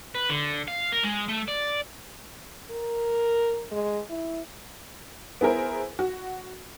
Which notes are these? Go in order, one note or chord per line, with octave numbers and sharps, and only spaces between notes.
B4
D3
F5
A#4
G#3
A3
D5
A#4
G#3
E4
B3 E4 G#4 A#4 C5
F#4